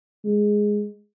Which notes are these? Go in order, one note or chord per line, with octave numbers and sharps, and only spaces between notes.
G#3